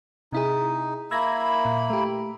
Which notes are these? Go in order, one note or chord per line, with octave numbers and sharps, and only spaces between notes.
C3 D#4 E4 G#4
A#3 E4 B5 E6 G#6 A#6
A#2
A3 G4